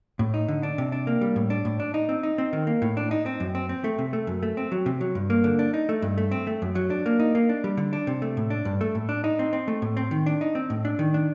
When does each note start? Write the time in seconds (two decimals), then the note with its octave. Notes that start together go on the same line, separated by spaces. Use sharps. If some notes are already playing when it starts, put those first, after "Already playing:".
0.19 A2
0.34 D#4
0.48 D3
0.63 D4
0.78 C3
0.92 D4
1.07 A#3
1.21 G3
1.36 A2
1.50 D4
1.65 A2
1.80 D4
1.94 D#4
2.09 C4
2.23 D#4
2.38 C4
2.53 D#3
2.67 A#3
2.82 A2
2.97 D4
3.11 D#4
3.26 C4
3.40 F#2
3.55 C4
3.69 C4
3.84 A3
3.99 C3
4.13 A3
4.27 F#2
4.43 A3
4.57 C4
4.72 F#3
4.86 C3
5.01 F#3
5.15 G2
5.30 A#3
5.44 D3
5.59 D4
5.74 D#4
5.89 A3
6.02 G2
6.18 A3
6.32 C4
6.47 A3
6.62 F#2
6.75 F#3
6.90 D4
7.06 A#3
7.20 D#4
7.35 A#3
7.49 D4
7.64 G3
7.77 D3
7.93 D4
8.07 C3
8.22 A3
8.37 A2
8.50 D4
8.65 G2
8.81 A3
8.95 A2
9.09 D4
9.24 D#4
9.39 C4
9.53 C4
9.68 A3
9.82 A2
9.97 C4
10.11 D#3
10.26 D4
10.41 D#4
10.55 C4
10.70 A2
10.85 D4
10.99 D#3
11.14 D4